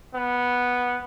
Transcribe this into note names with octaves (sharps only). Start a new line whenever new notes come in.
B3